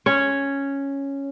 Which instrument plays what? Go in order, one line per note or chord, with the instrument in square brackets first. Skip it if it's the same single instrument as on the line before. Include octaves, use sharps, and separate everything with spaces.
[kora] C#4 C#5